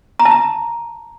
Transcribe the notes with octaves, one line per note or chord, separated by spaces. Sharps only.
A#5
A5
A#5